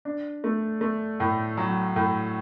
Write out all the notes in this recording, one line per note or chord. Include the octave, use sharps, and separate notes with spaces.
D4
A3
A3
A2
F#3
A2